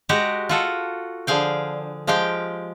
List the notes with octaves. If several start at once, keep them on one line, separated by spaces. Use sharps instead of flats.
G#3 F#4 G4 A#5
F4 F#4 A4
D3 F3 G#4 F5 G5
F3 G#3 G4 F5 G5